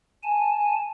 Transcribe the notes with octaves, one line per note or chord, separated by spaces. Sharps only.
G#5 A5